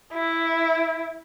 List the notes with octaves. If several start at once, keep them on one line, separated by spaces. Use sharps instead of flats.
E4